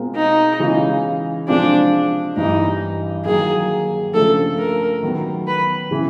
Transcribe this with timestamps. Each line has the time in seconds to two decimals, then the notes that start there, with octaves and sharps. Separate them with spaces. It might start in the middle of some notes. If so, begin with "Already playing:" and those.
Already playing: B2 G#3 C4 F4 A#4
0.16 D#4
0.59 C#3 E3 G#3 C#4 F4
1.48 C3 F3 G#3 C4 D4 F4
2.37 G2 E3 G3 D#4
3.25 D#3 F#3 A#3 G#4
4.14 C#3 F3 A3 D4 A4
4.58 A#4
5.03 D#3 F#3 B3
5.47 B4
5.91 C#3 E3